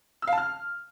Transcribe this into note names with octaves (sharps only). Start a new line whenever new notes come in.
E6
F5
A5
F6